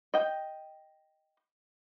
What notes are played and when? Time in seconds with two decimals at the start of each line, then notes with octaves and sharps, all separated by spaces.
0.14 D#5 G5